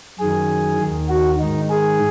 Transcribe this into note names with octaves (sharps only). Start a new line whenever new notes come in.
F#2 D#3 G#4
D#2 D#3
F#4
G#2 D#3 D#4
G#4